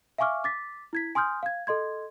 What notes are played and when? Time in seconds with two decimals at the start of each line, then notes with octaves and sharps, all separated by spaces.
0.18 E5 F5 G#5 C#6 D6 F6
0.44 D6 A6 B6
0.93 E4 G#6 B6
1.15 G#5 C6 D#6 F6 G6
1.43 F5 G#6
1.67 A4 D#5 C6 G#6